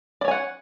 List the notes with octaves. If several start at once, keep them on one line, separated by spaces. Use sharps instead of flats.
C#5 D5 F#5 G#5